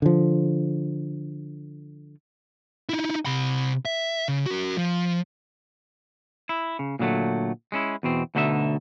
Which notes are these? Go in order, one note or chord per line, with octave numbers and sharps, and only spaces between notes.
D3 F3
D#4 E4
C3 B5
E5
C#3
F#4 A#4
F3
E4
C#3
A#2 D3 F#3 A3
G#3 C#4 E4
E2 B2 C4
D2 B2 D3 D#4 B4 E5